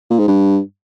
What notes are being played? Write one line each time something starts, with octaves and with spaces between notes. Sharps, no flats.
A#2
G#2
G2